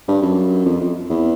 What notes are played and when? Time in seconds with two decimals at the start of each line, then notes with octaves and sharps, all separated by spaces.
0.08 G2
0.22 F#2
0.65 F2
0.81 F2
1.09 E2